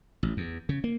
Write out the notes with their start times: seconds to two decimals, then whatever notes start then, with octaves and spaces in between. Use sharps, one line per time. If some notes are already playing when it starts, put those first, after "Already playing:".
0.23 A1
0.37 E2
0.69 C#3
0.84 A#3